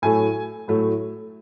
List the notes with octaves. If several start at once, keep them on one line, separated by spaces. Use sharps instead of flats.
A2 F#3 A3 G#5
A2 F#3 A3